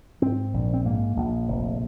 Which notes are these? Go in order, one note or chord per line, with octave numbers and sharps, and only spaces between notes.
G#2 C4
A#1
C4
G#2 A#3
A#1
F1